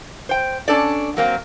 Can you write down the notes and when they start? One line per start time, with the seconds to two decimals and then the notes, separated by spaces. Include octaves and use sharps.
0.29 C5 G5
0.68 C#4 D4 A4 D5
1.17 F#3 A#3 C4